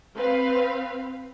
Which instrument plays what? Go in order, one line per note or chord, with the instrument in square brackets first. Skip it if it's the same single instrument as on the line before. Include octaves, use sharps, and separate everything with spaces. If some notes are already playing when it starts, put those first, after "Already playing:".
[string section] C4 B4 F5